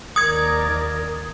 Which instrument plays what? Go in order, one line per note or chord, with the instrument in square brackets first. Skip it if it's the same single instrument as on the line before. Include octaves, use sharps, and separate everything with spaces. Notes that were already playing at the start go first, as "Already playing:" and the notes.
[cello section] D#2 A#4 D5 [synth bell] D#6 G#6